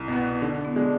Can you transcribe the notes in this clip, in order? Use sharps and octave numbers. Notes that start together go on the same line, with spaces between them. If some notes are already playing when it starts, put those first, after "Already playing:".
Already playing: C2 E4
B2 B3
D3 D4
B3
G#3 D4